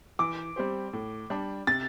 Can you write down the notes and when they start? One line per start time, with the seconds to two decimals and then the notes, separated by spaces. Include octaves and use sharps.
0.19 E3 D6
0.56 G3 C4 G4 C5
0.93 A2
1.30 G3 D4
1.67 C3 A6